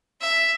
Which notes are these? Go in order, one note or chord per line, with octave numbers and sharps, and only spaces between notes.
E5